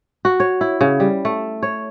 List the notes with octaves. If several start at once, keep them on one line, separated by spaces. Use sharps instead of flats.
F#4
C#5
E4
C#3
G3
A3
C#5